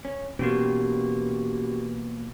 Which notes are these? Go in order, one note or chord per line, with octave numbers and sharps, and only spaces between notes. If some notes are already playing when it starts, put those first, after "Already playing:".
C#4
B2 E3 A#3 C#4 F#4 G4